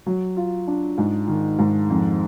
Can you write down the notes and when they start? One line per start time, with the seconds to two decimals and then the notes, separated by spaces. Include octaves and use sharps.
0.06 F#3
0.37 F4
0.67 D4
0.98 G#2
1.28 D#3
1.59 G#2
1.90 F2